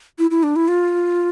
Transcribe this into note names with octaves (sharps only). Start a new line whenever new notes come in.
E4
E4
D4
E4
F4